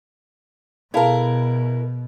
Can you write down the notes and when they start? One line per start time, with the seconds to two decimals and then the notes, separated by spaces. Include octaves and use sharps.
0.94 B2 E4 G#4 A#4 F5 A5